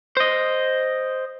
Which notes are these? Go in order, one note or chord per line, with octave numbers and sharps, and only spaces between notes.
C5 D#5